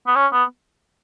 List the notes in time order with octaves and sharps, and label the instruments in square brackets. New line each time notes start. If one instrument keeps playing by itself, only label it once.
[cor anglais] B3
C#4
B3